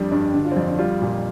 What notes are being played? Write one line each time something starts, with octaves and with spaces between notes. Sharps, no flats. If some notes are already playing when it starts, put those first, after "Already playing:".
Already playing: F2 G3 D4
G2 D4
D3 D4
F4
C4
F2 D4
D4
G3 F4
A#2